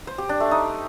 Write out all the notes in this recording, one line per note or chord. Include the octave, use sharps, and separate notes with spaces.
C5
G4
D4
A3
D#4